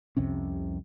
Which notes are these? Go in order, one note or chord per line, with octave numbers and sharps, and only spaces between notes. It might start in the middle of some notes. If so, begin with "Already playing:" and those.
C2 F2 C3 C#4